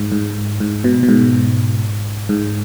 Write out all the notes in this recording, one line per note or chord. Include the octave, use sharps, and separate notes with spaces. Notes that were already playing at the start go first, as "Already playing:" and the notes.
Already playing: G#2
G#2
G#2
B2
B2
G#2
G#2